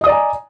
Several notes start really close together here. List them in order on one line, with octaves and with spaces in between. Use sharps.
D#5 D#6 D5 A#5 G#5